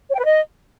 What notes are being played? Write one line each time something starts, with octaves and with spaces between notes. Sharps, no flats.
C#5
G5
B4
D#5